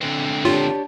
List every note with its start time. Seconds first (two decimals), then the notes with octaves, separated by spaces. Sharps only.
0.01 D3 C4
0.45 D4 F4 G4 C#5